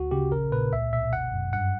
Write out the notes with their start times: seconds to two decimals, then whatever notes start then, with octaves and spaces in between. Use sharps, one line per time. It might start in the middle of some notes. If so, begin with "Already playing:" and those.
Already playing: D2 F#4
0.11 C#3 G4
0.32 A#1 A#4
0.52 A#2 B4
0.72 C#2 E5
0.93 B2 E5
1.13 G1 F#5
1.33 F#2
1.53 G2 F#5